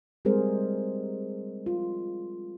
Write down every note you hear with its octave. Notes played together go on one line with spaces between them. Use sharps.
G3 G#3 C4 G#4 A#4 C5
F4